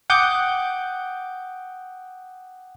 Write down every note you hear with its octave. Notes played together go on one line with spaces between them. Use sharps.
F#5 G5 D6 D#6 G6